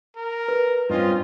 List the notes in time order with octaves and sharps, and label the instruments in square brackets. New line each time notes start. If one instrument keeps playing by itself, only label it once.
[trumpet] A#4
[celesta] B4
[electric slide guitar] G2 [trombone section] C4 C#4 F4 [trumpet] D#5